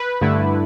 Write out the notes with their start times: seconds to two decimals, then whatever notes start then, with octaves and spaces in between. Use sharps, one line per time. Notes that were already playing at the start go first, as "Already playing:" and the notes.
Already playing: B4
0.21 G2 D3 A3 E4